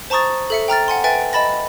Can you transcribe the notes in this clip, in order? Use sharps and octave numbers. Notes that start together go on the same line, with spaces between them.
C5 A5 A#5 C#6 D#6 A6
A4 E5 C#7
G5 A#5 F6 A6
F#5 G#5 C6
B4 E5 G5 G#5 A6 D7
D#5 A5 B5 A6 A#6